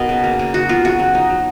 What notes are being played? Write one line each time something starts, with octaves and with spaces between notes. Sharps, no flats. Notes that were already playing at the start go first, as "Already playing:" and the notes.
Already playing: B2 B3 D#4 A#4
C#3
A#3
C#3
D#4 F#4
B3 F4
C#3 F#4
F#3
D#4
F#3